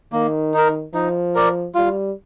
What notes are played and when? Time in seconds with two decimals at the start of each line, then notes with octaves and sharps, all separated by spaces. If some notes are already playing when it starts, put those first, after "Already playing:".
0.13 D#3 A#3
0.54 D#4 A#4
0.94 F3 D#4
1.35 A#4 D5
1.75 G3 F4